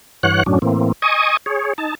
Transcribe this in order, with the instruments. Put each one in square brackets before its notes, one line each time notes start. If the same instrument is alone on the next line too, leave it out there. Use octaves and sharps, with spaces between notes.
[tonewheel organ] G2 E3 C#5 F#5 F#6
F#2 A2 F#3 C#4 D4
A2 E3 A#3 C4
D#5 G#5 C#6 D#6
G#4 C#5
D#4 A5